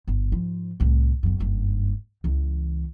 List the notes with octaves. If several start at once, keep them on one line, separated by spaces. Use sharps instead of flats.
G1
G#2 F3
C2 A2
G1 F#2
F#1 G2
C#2 E3